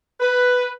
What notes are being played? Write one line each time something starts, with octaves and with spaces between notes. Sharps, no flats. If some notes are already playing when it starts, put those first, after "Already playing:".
B4